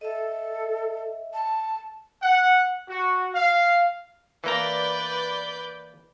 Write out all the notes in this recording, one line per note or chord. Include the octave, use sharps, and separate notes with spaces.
A4 D#5 E5
A5
F#5
F#4
F5
E3 A#3 B4 D5 A#5 G6